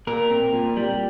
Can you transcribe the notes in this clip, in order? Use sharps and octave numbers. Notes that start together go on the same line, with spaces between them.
A#2 A#4
C4
A#2
G3